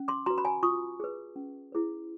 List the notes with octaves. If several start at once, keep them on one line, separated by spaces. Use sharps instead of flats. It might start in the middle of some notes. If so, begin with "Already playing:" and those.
Already playing: C#4
C6 D6
F#4 B4 A#5 C6
B5
G#5 A#5
F4 C#6 D#6
G#4 B4
C#4
E4 G#4 B4